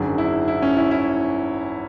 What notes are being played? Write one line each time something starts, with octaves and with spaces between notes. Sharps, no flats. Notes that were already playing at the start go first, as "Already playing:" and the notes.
Already playing: G#1 F#2 D3 G#4
E4
E4
C#4
E4
E4